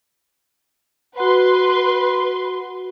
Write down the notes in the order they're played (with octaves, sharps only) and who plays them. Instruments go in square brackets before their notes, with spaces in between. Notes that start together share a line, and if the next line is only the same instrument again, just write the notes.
[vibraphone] F#4 F#5 [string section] B4 C6